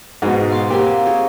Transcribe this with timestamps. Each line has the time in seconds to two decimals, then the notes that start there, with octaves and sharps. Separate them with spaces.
0.22 G#2 B2 G#3 F#4 D#5
0.51 F5 C6 D6
0.70 A#3 C4 G4 G#5
1.06 D#4 G#4 C#5